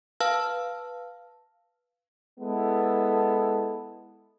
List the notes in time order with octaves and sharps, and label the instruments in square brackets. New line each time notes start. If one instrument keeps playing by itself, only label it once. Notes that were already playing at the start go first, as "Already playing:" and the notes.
[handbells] B4 F5 A5 E6 F6
[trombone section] G#3 B3 E4 A4